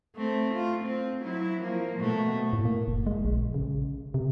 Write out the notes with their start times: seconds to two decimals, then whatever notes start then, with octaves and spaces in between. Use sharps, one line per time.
0.16 A3 C4
0.54 F4
0.84 C4
1.21 F#3 E4
1.61 F3 A#3
1.98 B2 A3
2.53 A2
2.65 A#3
2.88 F#1
3.07 G#3
3.25 A#1
3.54 C#3
4.14 C3